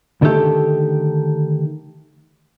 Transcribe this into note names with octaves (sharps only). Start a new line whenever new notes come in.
D3 D#3 A3 C4 G4 A4